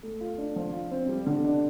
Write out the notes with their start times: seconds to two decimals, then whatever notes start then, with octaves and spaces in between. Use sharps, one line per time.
0.03 A3
0.21 F4
0.38 D4
0.56 F3
0.73 F4
0.91 C4
1.09 G3
1.26 D3
1.44 D4